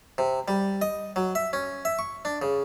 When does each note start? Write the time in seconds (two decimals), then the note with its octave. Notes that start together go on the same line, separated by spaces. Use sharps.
0.18 C3
0.48 G3
0.82 D#5
1.16 F#3
1.35 E5
1.53 C#4
1.85 E5
1.99 C#6
2.25 D4
2.42 C#3